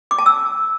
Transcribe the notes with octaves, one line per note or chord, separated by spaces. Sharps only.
D6
A5
E6